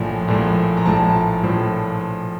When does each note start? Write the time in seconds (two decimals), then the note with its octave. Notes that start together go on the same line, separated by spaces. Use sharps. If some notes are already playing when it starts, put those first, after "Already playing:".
Already playing: A#1 A2 F3 G#5
0.28 A#1 A2 F3
0.77 A#5
0.85 A#1 A2 F3 A5
1.43 A#1 A2 F3